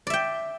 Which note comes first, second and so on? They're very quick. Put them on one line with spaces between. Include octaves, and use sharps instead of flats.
D5 E5 G5